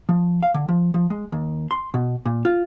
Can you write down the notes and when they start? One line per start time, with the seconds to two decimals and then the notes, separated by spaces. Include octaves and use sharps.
0.09 F3
0.43 F5
0.54 D3
0.68 F3
0.94 F3
1.10 G#3
1.32 D#2
1.71 C6
1.94 B2
2.25 A#2
2.45 F4